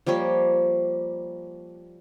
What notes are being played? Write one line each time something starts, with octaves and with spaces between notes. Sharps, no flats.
F3 G3 A#3 C#5